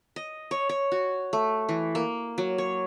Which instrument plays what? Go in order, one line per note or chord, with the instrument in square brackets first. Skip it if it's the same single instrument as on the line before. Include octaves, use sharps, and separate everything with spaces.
[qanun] D#5
C#5
C#5
F#4
A3
E3
A#3
F#3
C#5